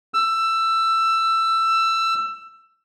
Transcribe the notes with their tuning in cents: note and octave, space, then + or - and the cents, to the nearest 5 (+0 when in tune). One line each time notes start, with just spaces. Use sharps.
E6 +15